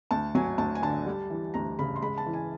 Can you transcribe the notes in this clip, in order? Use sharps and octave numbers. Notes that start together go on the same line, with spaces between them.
D2 A5
F#3 G#5
D2 A5
G#5
D3 A5
G3
E3
D2 A#5
C#3 B5
C6
G#3 B5
A5
E3
G#5